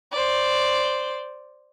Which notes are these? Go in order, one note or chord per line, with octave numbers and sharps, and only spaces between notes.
C5 D5